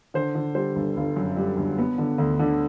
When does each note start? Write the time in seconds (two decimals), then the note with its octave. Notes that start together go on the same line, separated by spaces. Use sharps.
0.14 D3 C5
0.35 D3
0.55 G3 C5
0.76 G1
0.97 G1
1.16 F#2
1.37 G3
1.57 G1
1.78 B3
1.98 D3
2.18 D2
2.39 D3